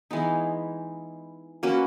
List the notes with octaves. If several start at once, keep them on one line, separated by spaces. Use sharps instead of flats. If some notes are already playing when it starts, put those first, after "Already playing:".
E3 G#3 B3 D#4
A#3 C#4 F#4 B4